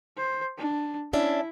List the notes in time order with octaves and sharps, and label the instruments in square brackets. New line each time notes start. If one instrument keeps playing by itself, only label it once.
[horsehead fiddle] C5
D4
[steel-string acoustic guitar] C#4 D4 E5 [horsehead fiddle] E4